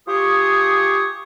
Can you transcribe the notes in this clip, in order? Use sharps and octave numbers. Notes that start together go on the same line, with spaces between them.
F4 G4 G#4 C#6 D#6